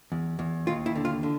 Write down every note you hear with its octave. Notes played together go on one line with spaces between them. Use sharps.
E2
E2
D#2 F4
E4
D3
F4
D3